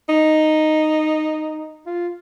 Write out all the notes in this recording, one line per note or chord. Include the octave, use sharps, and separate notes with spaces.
D#4
F4